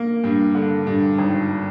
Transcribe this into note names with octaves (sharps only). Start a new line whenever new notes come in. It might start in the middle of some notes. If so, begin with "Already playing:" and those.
Already playing: A#3
G2
D3
G2
G#1